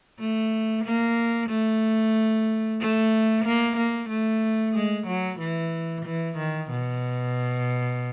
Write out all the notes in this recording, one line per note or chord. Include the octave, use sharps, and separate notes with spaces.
A3
A#3
A3
A3
A#3
A#3
A3
G#3
F#3
E3
E3
D#3
B2